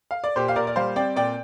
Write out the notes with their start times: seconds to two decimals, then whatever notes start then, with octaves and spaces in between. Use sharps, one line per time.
0.11 F5
0.24 D5
0.36 A#2 G4 C5
0.48 F5
0.56 A#2 A#4 D5
0.67 D5
0.76 G3 C5 F5
0.96 C4 D5 G5
1.16 A#2 D5 G5